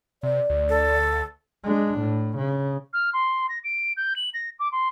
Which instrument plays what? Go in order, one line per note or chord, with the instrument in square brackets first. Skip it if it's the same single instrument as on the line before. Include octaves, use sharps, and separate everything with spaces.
[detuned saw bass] C3 [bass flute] D5
[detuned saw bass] D2
[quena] A4
[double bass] G#3 D4
A2
C#3
[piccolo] F6
C6
A#6
D7
G6
F#7
A#6
D6
C6